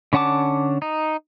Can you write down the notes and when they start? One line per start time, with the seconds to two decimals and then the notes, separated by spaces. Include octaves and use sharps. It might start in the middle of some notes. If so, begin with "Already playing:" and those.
0.13 D3 C#4 F#5 A5 D6
0.82 D#4